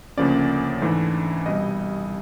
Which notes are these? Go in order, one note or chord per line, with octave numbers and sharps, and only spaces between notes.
D2 C#3 F3 A#3 C#4 D5
G#2 E3 A3 D4
C2 B2 G3 D#5